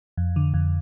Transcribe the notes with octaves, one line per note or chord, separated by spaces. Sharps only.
F2
D3
F2